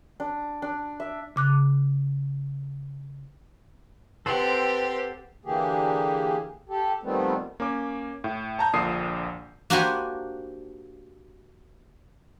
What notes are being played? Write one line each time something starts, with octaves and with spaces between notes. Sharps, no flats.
D4
D4
E5
C#3 D6 F#6
C4 G4 A4 B4 C5 F#5
D3 E3 A#3 G4 G#4
G4 A4
D#3 F3 G3 A3 B3 C4
A#3 C#4 D6
A2
A5 A#5 G6
A#1 A#2 D3 D#6 C7
A#3 D4 F#4 G4 C5 G#5